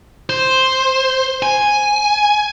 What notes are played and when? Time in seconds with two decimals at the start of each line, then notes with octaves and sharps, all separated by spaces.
0.29 C5
1.43 G#5